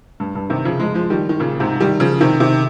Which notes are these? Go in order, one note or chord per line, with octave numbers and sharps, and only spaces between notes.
G2
G2
C3 D#3
C#3 F3
F3 G#3
F3 G#3
D#3 G3
D#3
A#2 C#3
G#2 C3
D#3 G3
C#3 F3
C3 D#3
C3 D#3